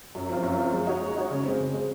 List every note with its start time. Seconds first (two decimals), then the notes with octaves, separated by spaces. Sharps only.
0.15 F#2
0.29 F3 C4 F4
0.43 F#2
0.58 F3 C4 F4
0.73 G#3
0.87 D#4 F#4 C#5
1.01 G#3
1.16 D#4 F#4 C#5
1.30 C#3
1.45 G#3 C4
1.60 C#3
1.74 G#3 C4